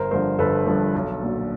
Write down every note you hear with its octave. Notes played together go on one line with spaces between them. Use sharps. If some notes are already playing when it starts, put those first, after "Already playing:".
Already playing: G1 A#4 C5
G2 D3 F3 A#4 C5
G1 A4 B4
G2 D3 F3 A4
B1
A#2 F#3